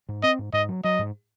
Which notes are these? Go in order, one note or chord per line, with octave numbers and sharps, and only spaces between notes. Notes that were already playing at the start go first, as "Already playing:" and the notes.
G#2
C4 D#5
G#2
G#2 D#5
F#3
F#3 D#5
G#2